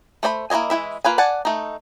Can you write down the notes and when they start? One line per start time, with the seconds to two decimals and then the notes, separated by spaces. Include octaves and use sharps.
0.23 A3 C5 D5 B5
0.50 A#3 E4 C#5 D#5 G#5
0.70 E3 G#3 E4 E5
1.05 A#3 F4 B4 G#5
1.18 D5 F#5 G#5 A5
1.45 A3 D#4